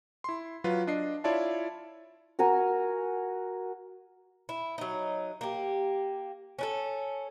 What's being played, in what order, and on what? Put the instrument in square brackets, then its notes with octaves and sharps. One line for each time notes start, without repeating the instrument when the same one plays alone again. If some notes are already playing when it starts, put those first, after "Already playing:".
[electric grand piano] E4 C6
F#3 F4 B4
D4 D#5 C7
E4 F4 C#5 D5 E5 A5
[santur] F#4 A#4 G#5 A#5
[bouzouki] E4
F#3 D#4
A#3 G4
C#4 D4 A4